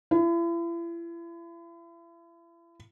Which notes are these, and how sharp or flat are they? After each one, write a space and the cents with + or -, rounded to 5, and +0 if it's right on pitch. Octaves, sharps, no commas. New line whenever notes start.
E4 +40